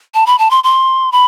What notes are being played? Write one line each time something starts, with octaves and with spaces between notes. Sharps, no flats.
A5
B5
A5
C6
C6
B5